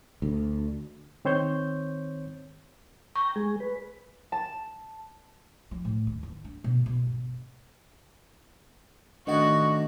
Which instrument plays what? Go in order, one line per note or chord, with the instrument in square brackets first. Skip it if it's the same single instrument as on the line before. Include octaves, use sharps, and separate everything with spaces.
[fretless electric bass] D2
[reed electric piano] D#3 C4 C5 C#5 G6
[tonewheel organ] G5 A#5 [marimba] C#6
[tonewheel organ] G#3 G#4
B4
[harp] A5
[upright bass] F3
A2
D#2
E3
D4
B2
B2
G1
[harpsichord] A2 D#3 G#5 [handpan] D4 D#5 F#5 [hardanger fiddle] F#4